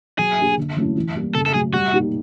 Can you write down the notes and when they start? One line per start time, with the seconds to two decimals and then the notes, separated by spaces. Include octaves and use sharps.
0.19 F#3 G#4
0.38 A#3 D4 G4
0.57 D3
0.77 F#3 A3 C#4 E4
0.96 E3
1.16 G3 A#3
1.35 C#3 A4
1.46 A4
1.54 F#3 A3 G#4
1.73 G3 F#4
1.93 A#3 D#4 G4